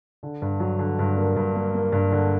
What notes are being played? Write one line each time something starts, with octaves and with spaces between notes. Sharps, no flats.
D3
G2
F#3
D3
G2
A#3
G2
A#3
A#3
G2
D3